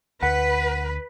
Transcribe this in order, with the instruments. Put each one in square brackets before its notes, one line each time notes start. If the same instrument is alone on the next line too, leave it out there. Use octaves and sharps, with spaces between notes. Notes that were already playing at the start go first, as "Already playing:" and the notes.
[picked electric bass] D2 [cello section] B4 [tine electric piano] F#5